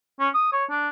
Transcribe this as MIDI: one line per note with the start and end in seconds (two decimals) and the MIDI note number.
0.20 0.29 61
0.34 0.51 87
0.53 0.64 73
0.70 0.89 62